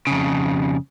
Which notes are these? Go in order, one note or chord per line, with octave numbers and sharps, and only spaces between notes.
F2 C#3